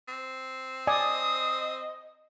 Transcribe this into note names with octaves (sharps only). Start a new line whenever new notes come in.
C4
D5 D#5 G#5 D#6